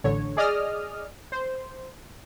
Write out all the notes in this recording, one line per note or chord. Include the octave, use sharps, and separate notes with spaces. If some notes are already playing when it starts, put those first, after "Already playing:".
A1 D3 C#5
G#4 D5 D#5 D#6 F6
C5